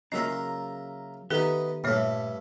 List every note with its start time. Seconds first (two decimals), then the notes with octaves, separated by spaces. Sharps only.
0.12 C#3 F#3 A#3 F4 D#5 E5 A#5
1.31 D#3 B3 D#4 G4 A4 E5
1.84 G2 A#2 D3 G3 A3 C#5